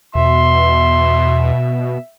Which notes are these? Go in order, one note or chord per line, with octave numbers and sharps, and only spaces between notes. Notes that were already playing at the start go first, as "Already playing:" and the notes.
E2 B2 E5 C6